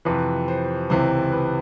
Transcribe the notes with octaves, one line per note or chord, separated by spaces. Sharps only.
F2 C3 E3 B4
C5
C#2 C3 E3 C5
B4